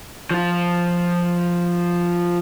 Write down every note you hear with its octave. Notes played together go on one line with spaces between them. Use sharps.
F3 F4